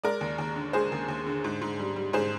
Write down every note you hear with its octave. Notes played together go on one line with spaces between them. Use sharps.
G#3 A#4 D5
D#2
D#2
D3
G#3 G#4 C5
D#2
D#2
D3
G#2
G#2
G3
G3
G#2 G#4 C5